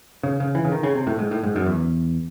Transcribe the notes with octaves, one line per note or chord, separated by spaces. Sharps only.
C#3
C#3
E3
C#3
D#3
C#3
C3
A2
G#2
A2
G#2
F#2
E2